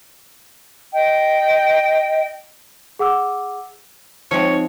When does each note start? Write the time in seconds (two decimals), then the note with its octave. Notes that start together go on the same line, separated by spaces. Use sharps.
0.92 D#5 G5
2.99 G#4 F#5 D6 E6
4.31 F3 G#3 C4 D#4 C#5